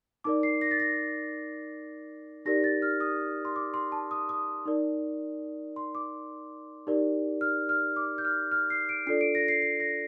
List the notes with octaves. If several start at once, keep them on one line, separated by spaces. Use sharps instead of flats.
D#4 A#4 D5 D6
C7
A#6
A6
A#6
D#4 G4 A#4 D5 A#6
A6
F6
D#6
C6
D6
C6
A5
D#6
D#6
D#4 A#4 D5
C6
D6
D#4 G4 A#4 D5
F6
F6
D6
G6
F6
F6
C7
D7
D4 F4 A4 D5 C7
D7
A#6
C7
C7
A#6